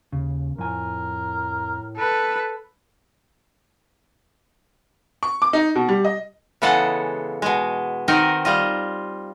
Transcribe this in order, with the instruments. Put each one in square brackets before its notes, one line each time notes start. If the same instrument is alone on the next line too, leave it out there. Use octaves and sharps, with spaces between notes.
[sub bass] D#2 [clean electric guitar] C#3
[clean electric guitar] F2 G#5 [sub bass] A2 [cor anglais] A#4
[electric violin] A4 B4
[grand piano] C#6
D6
D#4
B2
G3
D#5
[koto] C#3 E3 G#3 B3 A4 F#5
B2 G#3
D#3 C4 D#4 F#4 A#4 D#5
G3 F4 D#5